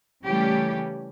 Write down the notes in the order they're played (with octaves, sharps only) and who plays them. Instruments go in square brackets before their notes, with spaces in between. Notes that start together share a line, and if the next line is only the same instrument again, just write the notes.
[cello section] C#3 E3 G3 A3 C#4 G4